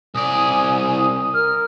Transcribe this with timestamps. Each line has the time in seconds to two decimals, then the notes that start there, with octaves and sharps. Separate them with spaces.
0.15 C2 D5 G#5 D#6
1.34 A#4 F6